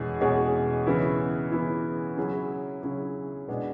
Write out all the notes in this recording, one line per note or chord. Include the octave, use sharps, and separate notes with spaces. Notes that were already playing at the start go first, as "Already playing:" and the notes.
Already playing: E2 B2 G#3 C#4 G#4
E2 B2 G#3 C#4 G#4
C#3 E3 B3 E4
C#3 E3 B3 E4
C#3 F#3 C#4 E4 G#4
C#3 F#3 C#4 E4 G#4
B2 G#3 D4 G#4 B4